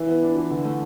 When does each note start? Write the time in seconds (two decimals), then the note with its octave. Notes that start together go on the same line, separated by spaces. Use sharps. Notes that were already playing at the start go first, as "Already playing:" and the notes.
Already playing: E3 E4
0.08 B3
0.23 D4
0.36 E3
0.51 D3
0.65 A3